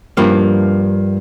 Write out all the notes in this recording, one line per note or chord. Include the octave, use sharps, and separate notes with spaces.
G2 F3 A#3